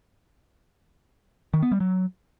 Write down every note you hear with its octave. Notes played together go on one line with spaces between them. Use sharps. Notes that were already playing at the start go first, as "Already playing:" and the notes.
D#3
B3
G3
F#3